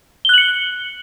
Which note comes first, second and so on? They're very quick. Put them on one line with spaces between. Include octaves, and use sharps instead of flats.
G7 F#6 F#7 C#7